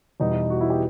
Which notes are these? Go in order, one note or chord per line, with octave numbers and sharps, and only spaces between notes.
E2 B2 G3 D#4
E4
F#4
E4
G4